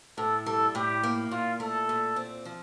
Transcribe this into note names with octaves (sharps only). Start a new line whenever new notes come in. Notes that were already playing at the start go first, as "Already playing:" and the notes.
A2 A4
G3 A4
A2 G4
A#3
A#2 F4
A3 A4
A#2
C4
F3